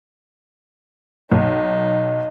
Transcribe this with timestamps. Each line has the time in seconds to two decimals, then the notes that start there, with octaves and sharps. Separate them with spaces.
1.31 B1 D#4